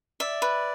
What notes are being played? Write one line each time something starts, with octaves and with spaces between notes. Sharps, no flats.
D5 E5
B4